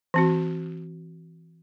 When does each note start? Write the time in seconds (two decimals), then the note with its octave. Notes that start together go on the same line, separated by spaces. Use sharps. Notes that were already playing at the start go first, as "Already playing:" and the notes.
0.14 E3 C4 F#4